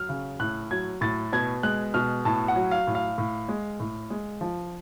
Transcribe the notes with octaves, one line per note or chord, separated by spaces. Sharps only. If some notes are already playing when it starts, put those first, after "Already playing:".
Already playing: F#3 F6
C#3
A2 F#6
F#3 G#6
A2 A6
B2 G#6
G#3 F#6
B2 F6
A2 A5
F#5
F#3
F5
A2
F5
A2
G#3
A2
G#3
F3